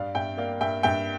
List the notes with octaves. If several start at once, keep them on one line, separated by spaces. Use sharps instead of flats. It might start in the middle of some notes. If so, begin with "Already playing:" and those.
Already playing: G2 D5 F5
G2 E5 G5
A#3 D5 F5
G2 E5 G5
G2 E5 G5